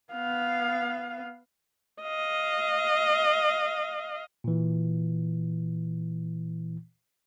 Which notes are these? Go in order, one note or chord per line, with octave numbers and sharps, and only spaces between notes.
B3 F5
D#5 F5
A#2 E3